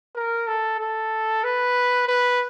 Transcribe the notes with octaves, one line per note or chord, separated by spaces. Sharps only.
A#4
A4
A4
B4
B4